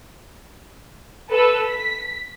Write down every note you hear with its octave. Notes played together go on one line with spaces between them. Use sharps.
A4 B4 E6
B6